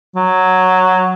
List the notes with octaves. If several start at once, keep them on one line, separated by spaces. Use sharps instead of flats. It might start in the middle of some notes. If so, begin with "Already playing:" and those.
F#3